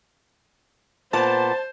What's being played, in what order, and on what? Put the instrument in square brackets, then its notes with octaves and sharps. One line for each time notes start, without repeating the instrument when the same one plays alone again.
[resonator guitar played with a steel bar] A#2 B3 [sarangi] C5 [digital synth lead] A5